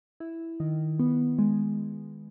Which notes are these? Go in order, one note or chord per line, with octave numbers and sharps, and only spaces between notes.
E4
D#3
B3
G#3